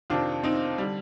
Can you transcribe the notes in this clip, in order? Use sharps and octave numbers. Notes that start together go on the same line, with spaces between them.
F2 C3 D#3 D4 F4
C4 D#4
D3 G3